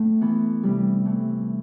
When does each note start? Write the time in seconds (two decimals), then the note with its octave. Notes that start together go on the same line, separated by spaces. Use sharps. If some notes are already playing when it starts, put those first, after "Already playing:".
Already playing: A2 A3
0.21 E3 B3
0.63 C3 G3
1.05 E3 A3